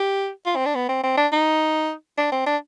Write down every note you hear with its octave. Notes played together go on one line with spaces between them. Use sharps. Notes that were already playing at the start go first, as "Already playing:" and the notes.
Already playing: G4
F4
C4
D4
B3
C4
C4
D4
D#4
D4
C4
D4